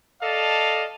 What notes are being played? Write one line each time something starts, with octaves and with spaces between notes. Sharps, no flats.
A4 D5 D#5 F5 A5